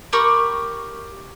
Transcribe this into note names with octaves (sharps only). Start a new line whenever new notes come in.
G4 A#4 B5 C#6